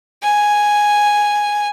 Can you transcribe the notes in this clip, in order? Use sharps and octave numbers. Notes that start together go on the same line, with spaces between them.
G#5